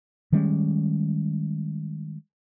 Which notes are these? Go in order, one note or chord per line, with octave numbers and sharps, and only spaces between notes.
D#3 G3 G#3 C#4